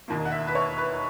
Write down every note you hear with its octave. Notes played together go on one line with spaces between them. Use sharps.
E1 D#2 D#3 A#3
F#5
E5
B4
C#5
B4